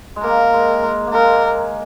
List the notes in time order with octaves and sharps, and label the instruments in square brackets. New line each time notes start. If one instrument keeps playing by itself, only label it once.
[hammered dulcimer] G#3
[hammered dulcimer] A#3 [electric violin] A#4
[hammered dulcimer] G#3
G#3
A#3
[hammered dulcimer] G#3 [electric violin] A#4